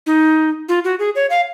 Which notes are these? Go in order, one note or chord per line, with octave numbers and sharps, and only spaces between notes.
D#4
F4
F#4
G#4
C#5
F5